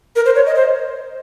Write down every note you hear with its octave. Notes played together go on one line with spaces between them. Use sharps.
A#4
C5
C#5
D#5
C5